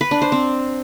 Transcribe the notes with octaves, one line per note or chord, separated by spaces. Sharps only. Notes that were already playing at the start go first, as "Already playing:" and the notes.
B4
D4
C5
C4